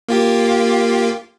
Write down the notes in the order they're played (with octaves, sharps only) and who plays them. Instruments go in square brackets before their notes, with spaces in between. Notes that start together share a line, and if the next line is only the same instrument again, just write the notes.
[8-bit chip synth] A#3 F4 G4